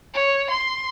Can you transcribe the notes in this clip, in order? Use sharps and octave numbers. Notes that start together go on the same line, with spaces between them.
C#5
C6